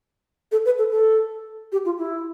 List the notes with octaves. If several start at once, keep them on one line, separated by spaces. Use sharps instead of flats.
A4
B4
A4
A4
G4
F4
E4